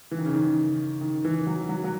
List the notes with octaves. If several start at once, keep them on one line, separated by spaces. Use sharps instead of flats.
E3
D#3
C#3
D#3
D#3
E3
F#3
F#3
F#3